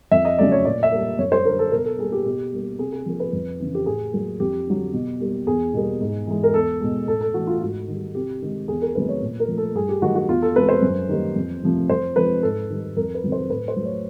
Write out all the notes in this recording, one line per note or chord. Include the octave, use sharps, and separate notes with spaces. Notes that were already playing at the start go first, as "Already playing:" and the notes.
F2 E5
D#5
C#3 F#3 A3 D5
C#5
A#2 D5
E5
G3 A#3
F#2 C#5
C5
D3 G3 A#4
A4
B2 A#4
A4
G3 A#3 G#4
G4
B2 G4
G3 A#3
C3 G#4
G#4
F3 A#3
B4
F2
C#3 E3
G4
A2 G#4
F#3 A#3
F2 G4
D3 F#3
B2
G3 A#3
E2 G#4
B2 G3 A#3
G#2
E3 G#3
A#4
E2 A4
B2 G#3
A2 A4
A4
E3 A3 F#4
F4
G#2 F#4
D#3 G3
C3 G4
D#3 G#3
E2 G#4
A#4
C3 D#3 F#3 A3 B4
C#5
A#2
A#4
F3 A3
A4
G2 G#4
G4
D#3 F#3 A3 F#4
F#4
E2 F4
A4
C3 E3 G#3 B4
C5
F#2
D#3 G3 A#3
F2
C3 F3 A3
F2 C5
C3 F3 G#3 B4
G#2 A4
D#3 G3
F2 A#4
B4
C3 D#3 F#3
C5
A2 B4
C5
F#3 A3
C#5